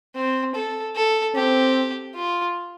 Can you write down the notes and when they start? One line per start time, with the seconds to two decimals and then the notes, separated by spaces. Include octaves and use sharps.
0.15 C4
0.55 A4
0.96 A4
1.35 C4 G4
2.15 F4